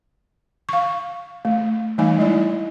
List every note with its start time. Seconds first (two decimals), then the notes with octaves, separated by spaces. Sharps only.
0.69 F5 C#6
1.45 A3
1.98 E3 G3 A3 D#4 G#5
2.19 G#3 E4 D5